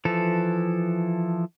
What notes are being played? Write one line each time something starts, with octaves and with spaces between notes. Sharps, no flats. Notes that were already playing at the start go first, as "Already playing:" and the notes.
E3 F3 A4